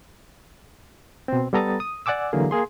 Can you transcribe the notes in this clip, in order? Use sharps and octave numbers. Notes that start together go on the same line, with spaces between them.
B2 C4
G3 B3 A4 A#5 D#6 A6
D#6
D5 F#5 G#5 D6 E6
D3 E3 F#3 A#3 G#4
A#3 G#4 C6